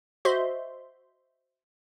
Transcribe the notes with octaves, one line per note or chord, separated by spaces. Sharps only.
F#4 C5 D#5 E5 C6